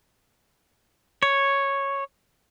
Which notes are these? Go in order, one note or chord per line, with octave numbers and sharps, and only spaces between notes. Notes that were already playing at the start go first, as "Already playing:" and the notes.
C#5